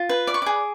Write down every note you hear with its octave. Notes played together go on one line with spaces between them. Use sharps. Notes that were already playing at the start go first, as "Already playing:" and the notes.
Already playing: F4
B4
D5 D6
C#6
G#4 D6